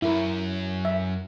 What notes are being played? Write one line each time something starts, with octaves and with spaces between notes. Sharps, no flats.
F#2 C#4 E4 A#4
E5